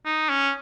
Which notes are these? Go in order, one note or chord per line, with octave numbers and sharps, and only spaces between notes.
D#4
C#4